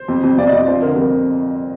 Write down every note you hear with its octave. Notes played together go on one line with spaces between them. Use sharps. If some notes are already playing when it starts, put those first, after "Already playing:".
Already playing: C5
F2
F2
F2 D5
D#5
F2
D5
F3 C5
D3 A#4
F2 A#4